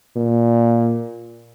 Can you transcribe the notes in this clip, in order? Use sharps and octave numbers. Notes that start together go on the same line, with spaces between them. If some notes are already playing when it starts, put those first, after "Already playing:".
A#2